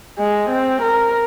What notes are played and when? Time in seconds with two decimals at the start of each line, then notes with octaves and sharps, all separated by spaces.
0.19 G#3
0.50 C4
0.82 A#4